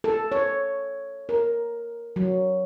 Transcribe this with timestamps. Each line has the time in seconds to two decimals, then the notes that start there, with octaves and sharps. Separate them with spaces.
0.04 A4
0.32 C#5
1.29 A#4
2.16 F#3